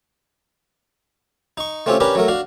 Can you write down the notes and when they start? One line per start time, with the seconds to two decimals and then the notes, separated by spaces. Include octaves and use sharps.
1.57 D#4 C#6
1.86 A3 C4 C#4 F4 G4
2.00 C#4 D4 G4 A#4 B4
2.15 F#3 A3 A#4
2.28 D4 F#4 F5